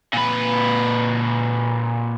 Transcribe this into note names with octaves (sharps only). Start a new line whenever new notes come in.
A#2 B4